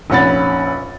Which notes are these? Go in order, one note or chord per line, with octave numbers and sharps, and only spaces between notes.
F1 A#1 C#4 F#5 B5 A6